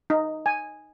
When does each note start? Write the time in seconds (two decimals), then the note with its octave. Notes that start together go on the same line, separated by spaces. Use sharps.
0.10 D#4
0.46 G#5